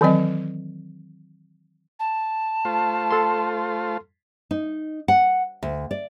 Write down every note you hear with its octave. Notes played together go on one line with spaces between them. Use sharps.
D#3 E3 F#3 C4 D#5
A5
A3 F4 C5
A4 C6
D#4
F#5
D2
D5